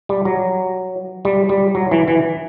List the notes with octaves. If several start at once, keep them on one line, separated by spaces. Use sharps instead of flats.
G3
F#3
G3
G3
F#3
E3
E3